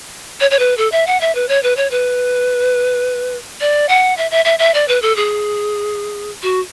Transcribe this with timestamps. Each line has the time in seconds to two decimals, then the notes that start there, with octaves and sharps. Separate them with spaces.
0.40 C#5
0.51 C#5
0.59 B4
0.77 A4
0.92 E5
1.07 F#5
1.21 E5
1.35 B4
1.48 C#5
1.63 B4
1.77 C#5
1.91 B4
3.61 D5
3.89 F#5
4.18 E5
4.31 E5
4.45 E5
4.59 E5
4.74 D5
4.88 B4
5.02 A4
5.16 G#4
6.43 F#4